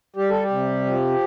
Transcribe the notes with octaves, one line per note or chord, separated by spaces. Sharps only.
G3 G4
A4
G4
C3
F3